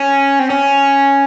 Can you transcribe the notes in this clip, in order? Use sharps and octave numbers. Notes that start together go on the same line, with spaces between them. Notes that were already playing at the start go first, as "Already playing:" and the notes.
Already playing: C#4
C4
C#4